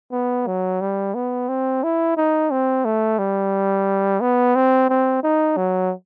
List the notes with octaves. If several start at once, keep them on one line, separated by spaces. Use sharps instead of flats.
B3
F#3
G3
B3
C4
E4
D#4
C4
A3
G3
B3
C4
C4
D#4
F#3